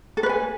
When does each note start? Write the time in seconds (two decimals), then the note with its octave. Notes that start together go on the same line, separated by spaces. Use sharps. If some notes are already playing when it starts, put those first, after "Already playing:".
0.17 A4
0.23 B4
0.29 G#5